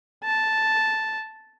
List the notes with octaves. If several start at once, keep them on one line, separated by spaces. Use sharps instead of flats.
A5